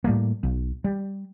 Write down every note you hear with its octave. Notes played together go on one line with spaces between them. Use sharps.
A2 G3 A3 A#3
B1
G3